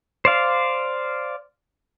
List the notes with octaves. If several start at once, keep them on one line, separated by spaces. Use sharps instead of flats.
C5 D5 F5